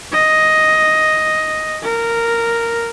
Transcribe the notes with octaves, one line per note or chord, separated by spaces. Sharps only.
D#5
A#4